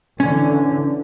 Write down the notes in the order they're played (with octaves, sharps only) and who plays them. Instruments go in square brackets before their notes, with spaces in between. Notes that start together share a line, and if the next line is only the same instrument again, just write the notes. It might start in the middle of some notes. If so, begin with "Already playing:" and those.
[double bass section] D3 E3 [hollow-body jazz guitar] C#4